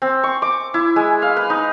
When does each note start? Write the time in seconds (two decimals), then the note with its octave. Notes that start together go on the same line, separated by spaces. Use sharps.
0.02 C4
0.23 C#6
0.42 D6
0.74 E4
0.96 G#3
1.22 F5
1.37 B4
1.50 D#4